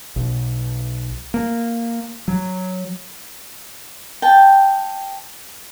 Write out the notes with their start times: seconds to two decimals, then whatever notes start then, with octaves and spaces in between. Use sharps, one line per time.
0.16 B1
1.34 A#3
2.28 F#3
4.22 G5 A5